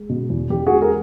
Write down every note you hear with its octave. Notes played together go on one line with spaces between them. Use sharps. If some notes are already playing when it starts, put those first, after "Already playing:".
Already playing: G#3
B2
E2
E2 G4
G#3 F#4 G#4
G#4 A#4